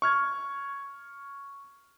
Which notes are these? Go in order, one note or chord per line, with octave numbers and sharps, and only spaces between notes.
C#6 F6 G#6